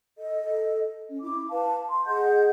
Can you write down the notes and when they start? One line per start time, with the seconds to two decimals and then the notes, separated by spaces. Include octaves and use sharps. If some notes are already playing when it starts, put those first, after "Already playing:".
0.18 A4 D#5
1.10 C#4
1.22 E4 D6
1.50 B4 F5 A5
1.89 C6
2.05 G#4 D#5 F#5 G6